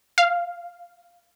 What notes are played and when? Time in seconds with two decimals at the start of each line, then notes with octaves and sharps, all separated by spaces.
0.18 F5